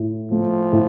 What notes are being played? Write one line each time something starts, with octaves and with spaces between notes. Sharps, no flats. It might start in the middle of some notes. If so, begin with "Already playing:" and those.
Already playing: A2
F3 A3
A2